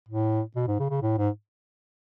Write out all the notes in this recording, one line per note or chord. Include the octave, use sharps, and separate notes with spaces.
A2
B2
G#2
C#3
C#3
A2
G#2